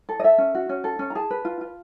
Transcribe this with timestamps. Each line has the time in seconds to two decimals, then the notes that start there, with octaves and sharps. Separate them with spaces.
0.09 A4
0.20 D#5
0.23 A4 E5
0.38 C#4
0.55 F#4
0.69 C#4
0.84 A4
0.99 C#4
1.10 A#5
1.15 G#4 A5
1.30 B4
1.45 F4
1.61 F4